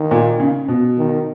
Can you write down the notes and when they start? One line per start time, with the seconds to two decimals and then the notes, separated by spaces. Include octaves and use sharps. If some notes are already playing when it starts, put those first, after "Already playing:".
Already playing: D#3
0.11 A#2
0.40 C#3
0.68 B2
0.97 D#3